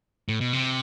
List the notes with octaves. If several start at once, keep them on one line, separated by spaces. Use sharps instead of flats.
A2
B2
C3